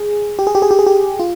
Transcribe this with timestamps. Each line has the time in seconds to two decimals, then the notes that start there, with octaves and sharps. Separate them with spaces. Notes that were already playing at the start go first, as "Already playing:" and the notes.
Already playing: G#4
0.39 G4
0.47 G#4
0.55 G4
0.62 G#4
0.71 G4
0.79 G#4
0.87 G4
1.20 F4